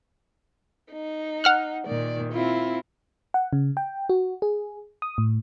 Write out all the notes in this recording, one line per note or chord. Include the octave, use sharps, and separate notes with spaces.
D#4
F#5 F6 F#6
A#2 D#3 D5
C4 E4 F4
F#5
C#3
G5
F#4
G#4
D#6
A2